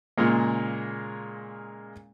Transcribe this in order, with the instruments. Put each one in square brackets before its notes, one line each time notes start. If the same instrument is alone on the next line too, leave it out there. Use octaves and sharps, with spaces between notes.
[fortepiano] A#2 C#3 G#3 A#3